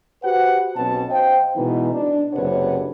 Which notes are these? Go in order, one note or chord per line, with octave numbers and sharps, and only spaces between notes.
F#4 G4 B4 C5 F#5
B1 B2 C4 C#4 A5
C5 D#5 F5 G5
B2 E3 G#3 B3 D#4
D4
F#1 C3 D4 B4 C#5 F#5